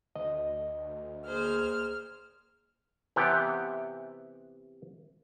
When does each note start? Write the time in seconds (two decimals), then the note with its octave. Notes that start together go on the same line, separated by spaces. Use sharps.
0.16 D2 D#5
1.26 A#3 G#4 C5 F6
3.16 C3 E3 B3 G4 F#5 G5